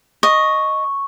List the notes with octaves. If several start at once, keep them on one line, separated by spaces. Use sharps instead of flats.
D#5 C#6